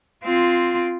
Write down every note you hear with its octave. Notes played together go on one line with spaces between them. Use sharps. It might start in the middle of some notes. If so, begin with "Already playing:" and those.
C4 F4